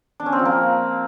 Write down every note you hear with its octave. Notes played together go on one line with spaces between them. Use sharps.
D4
C#4
C4
F3
A#3